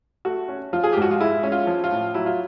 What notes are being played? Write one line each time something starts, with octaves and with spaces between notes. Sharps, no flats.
A3 F#4
C#4
F3 F4
G#4
G#2 G4
F#4
F4
G#3 E4
C#4
F4
F3
F4
A2
F#3 E4
F4